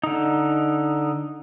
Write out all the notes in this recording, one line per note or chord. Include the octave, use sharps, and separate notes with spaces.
D3 D#4